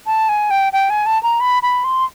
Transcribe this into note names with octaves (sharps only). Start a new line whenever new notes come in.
A5
G#5
G5
G5
G#5
A5
A#5
B5
B5
C6